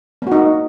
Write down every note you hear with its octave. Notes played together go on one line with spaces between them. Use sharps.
A#3 D#4 F#4